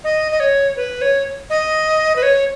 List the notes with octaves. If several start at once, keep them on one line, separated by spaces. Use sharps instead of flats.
D#5
D#5
C#5
B4
C#5
D#5
B4
C#5